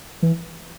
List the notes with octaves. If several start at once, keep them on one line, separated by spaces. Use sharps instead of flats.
E3